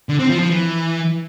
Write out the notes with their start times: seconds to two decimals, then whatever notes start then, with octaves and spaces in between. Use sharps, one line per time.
0.09 D3
0.19 C4
0.29 F3
0.40 F3
0.50 E3